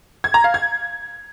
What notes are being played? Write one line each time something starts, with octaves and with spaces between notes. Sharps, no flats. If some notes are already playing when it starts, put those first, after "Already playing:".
G#6
A#5
F5
G#6